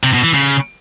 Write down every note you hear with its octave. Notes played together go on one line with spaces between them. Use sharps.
C3
B2
E3
C#3